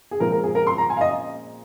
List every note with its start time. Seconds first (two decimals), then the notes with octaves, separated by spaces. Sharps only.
0.11 G#4
0.20 A#2 F3 G#3 C4 A#4
0.32 A#4
0.44 G#4
0.55 A#4
0.67 C6
0.78 A#5
0.90 G#5
0.97 F5
1.01 D#5